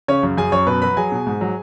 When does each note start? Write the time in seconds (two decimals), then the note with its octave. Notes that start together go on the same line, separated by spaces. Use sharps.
0.08 C#3 C#4 C#5
0.23 F#2
0.37 F#2 G#4 G#5
0.52 F#2 C#5 C#6
0.67 B2 B4 B5
0.82 F#3 B4 B5
0.97 F#3 G#4 G#5
1.12 B2
1.26 G#2
1.41 F#3